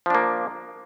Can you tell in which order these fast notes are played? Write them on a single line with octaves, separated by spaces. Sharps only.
F3 D4 A#3